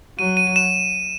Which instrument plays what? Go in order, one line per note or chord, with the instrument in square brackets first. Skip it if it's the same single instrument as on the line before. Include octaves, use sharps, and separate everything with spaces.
[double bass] F#3 [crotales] D#7
[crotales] D#7
D#7
E7